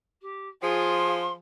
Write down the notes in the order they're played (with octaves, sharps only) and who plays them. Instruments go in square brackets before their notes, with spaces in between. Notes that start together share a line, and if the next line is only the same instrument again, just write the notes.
[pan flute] G4
[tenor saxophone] F3 [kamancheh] F4 G#4 [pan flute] C6